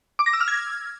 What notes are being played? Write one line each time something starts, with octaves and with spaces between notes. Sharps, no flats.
D6
A#6
E6
F6
G#6